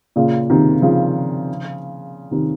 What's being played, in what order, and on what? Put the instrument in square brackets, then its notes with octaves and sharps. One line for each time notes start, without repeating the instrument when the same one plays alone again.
[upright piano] A#2 C#3
C3 D#3
C#3 F3
C3 D#3